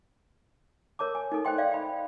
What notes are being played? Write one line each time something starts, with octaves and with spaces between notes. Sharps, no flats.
A#4 C#5 A5 D6
G#5
D#4 A4
C5 D#5 G5 C6
D5 D#5 F5
G5 B5